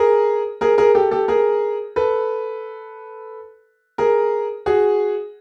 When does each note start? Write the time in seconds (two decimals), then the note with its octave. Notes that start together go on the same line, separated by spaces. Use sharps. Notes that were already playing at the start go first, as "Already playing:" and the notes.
Already playing: G#4 A#4
0.61 G#4 A#4
0.78 G#4 A#4
0.95 G4 A4
1.11 G4 A4
1.28 G#4 A#4
1.96 A4 B4
3.98 G#4 A#4
4.66 F#4 G#4